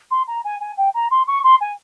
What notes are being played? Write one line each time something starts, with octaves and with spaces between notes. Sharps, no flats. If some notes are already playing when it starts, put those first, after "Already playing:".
C6
A#5
G#5
G#5
G5
A#5
C6
C#6
C6
G#5